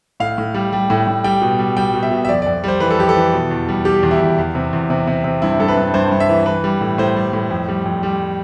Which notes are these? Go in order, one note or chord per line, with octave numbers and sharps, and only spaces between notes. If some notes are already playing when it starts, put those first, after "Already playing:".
A2 F5
A2
G3
G3
A2
A2
G3 G5
B2
G3
G3 G5
B2
E5
B2
E5
F2 D5
D5
F2
G3 C5
E3 B4
A4
F2 G4
A4
E3
B2
E2
G3
G3 G4
E2
E4
E2
E2
C3
E2
C3
C3
C3
G2 E4
G2 A4
B4
G2
G2 C5
G2
E5
E3
E3 B4
G3
A2
A2 C5
G3
A2
F2
G3
F2
G3